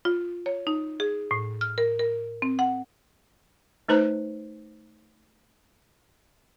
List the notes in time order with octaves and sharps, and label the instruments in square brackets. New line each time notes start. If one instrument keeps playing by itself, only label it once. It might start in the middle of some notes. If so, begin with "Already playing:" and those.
[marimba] F4
C#5
D#4
G#4
A2
F6
A#4
A#4
C4
F#5
[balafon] A3 D#4 B4 C5 A#5